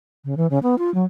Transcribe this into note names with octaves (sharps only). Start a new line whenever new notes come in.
C#3
E3
C#3
B3
F4
F#3